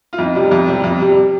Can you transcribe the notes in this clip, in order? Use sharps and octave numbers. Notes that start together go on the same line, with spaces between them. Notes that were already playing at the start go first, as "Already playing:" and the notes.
F4
F2 D#4
C3 G3
F2
C3 G3
F2
C3 G3